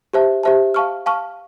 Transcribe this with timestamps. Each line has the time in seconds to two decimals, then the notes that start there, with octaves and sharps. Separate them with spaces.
0.13 G4 C5 E5 A5
0.43 G4 C5 E5 A5
0.74 F5 A5 C#6 F6
1.06 F5 A5 C#6 F6